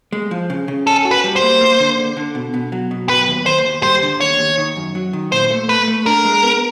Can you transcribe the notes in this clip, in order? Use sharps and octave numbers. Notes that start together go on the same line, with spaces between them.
G#3
F3
C#3
C#3
C#4 A4
F#4
B4
G3
C5
A#3
A#3
D3
D3
D3
B2
B2
F#3
B2
F#3 B4
D#2
D#2 C5
D#2
G3 C5
D3
D#2 C#5
D#2
D#3
F#2
F#3
D#3
A#2 C5
A3
A3 B4
A3
D4 A#4
G#3
B3